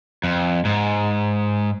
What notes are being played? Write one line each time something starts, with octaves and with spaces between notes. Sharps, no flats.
F2
G#2